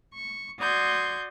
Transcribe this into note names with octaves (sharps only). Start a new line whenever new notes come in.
C#6
F#4 D5 C6 D#6 G6 G#6